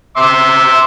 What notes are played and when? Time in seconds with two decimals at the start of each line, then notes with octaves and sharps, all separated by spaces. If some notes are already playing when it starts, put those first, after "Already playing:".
0.17 E5 C6 D6